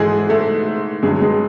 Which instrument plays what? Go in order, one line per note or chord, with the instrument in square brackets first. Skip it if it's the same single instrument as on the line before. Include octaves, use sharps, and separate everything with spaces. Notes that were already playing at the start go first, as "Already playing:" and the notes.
Already playing: [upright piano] G#2 E3 G#3 G#4 A4
A3 A4
G2 D3 F#3 G#3 G#4
G#3 G#4